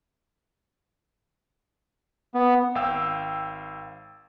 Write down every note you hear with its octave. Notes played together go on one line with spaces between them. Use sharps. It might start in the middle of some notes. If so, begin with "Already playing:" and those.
B3
G#1 F5 G5 E6